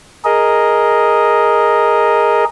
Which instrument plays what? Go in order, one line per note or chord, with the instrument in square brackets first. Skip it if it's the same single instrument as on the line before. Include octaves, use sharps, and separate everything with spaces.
[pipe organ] G#4 A#4 D#5